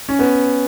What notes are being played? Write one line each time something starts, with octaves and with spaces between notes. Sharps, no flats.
C#4
B3